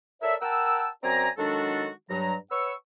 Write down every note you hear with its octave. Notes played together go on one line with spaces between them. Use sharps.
A4 A#4 C#5 D5 E5
A#4 F#5 G5 A5 E6
F#2 C4 D5 G#5 A#5
D#3 F#3 G#3 D4 F#4 A4
G2 F#3 A#5
B4 C#5 F#5 C#6 E6